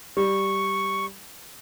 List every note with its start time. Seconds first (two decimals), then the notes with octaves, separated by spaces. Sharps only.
0.17 G3 C#6